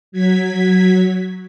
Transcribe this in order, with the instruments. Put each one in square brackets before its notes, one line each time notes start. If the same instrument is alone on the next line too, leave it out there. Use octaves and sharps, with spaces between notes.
[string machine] F#3 G#6 B6